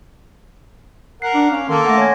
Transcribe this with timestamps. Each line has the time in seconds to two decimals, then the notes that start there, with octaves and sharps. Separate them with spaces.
1.22 A#4 F#5 C7
1.34 D4
1.51 C#4 F5
1.69 D#3 A#3 A4 C6
1.86 A3 F#5 A#6
1.98 C#5 G#5 G#6